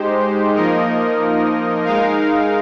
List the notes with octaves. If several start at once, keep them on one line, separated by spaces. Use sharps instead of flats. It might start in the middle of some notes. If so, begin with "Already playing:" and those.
Already playing: G#3 D#4 G4 C5
F3 A#3 D#4 A#4 D#5
G#3 D#4 A#4 F5